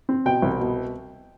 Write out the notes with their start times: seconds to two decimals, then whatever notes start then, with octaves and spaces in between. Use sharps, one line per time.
0.09 C4
0.26 B2 G5
0.42 C2
0.60 B2